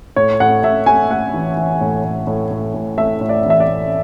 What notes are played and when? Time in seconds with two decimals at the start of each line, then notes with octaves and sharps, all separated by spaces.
0.16 A2 C#5
0.40 A2 F#5
0.63 A2 E5
0.86 A3 G#5
1.10 A3 F#5
1.34 E3
1.57 E3
1.81 A2
2.04 A2
2.27 A2
2.51 A2
2.74 A2
2.98 A3 E5
3.21 A2
3.29 D5
3.45 E3 E5
3.60 D5
3.69 A2